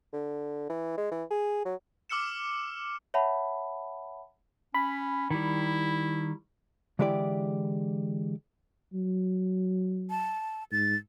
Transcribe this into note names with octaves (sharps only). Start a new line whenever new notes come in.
D3
E3
G#3
E3
G#4
F#3
D6 E6 F6 C#7 E7
C#5 E5 F#5 A5 B5
C#4 B5
D#3 G3 E4
D3 E3 G#3 E4 G4 D5
F#3
A5
G#2 A6